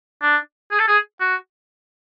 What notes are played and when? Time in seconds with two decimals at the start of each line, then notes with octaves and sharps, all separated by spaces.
0.22 D4
0.71 G#4
0.79 A4
0.88 G#4
1.20 F#4